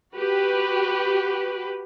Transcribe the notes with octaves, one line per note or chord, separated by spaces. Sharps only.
F#4 G4 B4